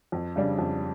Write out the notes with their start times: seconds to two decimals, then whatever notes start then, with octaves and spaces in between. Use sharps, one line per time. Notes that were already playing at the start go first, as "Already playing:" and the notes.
0.12 F2
0.36 C#3 G3 D4
0.59 F2